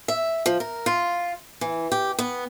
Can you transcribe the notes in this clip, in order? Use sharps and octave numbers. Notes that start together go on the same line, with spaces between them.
E5
F3
A#4
F4
E3
G4
B3